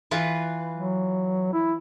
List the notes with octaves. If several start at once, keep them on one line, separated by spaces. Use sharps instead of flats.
E3 F4 B4
F#3
E4